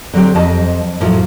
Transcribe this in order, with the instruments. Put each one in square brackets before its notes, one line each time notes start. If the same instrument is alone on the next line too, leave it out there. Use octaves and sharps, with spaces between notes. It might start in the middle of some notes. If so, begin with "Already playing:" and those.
[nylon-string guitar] D3 F#3 C4 G4
F2 D#5 A5
F2 A2 F3 F#3 F4